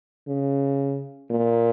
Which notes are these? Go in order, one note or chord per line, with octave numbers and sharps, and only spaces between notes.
C#3
A#2